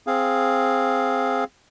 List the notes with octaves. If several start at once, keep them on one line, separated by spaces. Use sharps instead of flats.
C4 G#4 F5